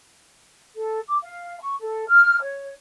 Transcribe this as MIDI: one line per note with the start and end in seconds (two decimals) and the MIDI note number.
0.76 1.00 69
1.09 1.17 86
1.22 1.58 77
1.60 1.75 85
1.80 2.07 69
2.08 2.38 89
2.41 2.71 73